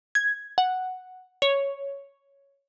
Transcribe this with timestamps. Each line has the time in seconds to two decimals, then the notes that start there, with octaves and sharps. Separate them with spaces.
0.15 G#6
0.58 F#5
1.42 C#5